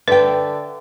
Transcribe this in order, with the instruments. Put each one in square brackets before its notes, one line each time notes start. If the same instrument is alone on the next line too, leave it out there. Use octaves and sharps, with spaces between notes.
[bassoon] D3 [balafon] B4 [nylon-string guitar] E5 G5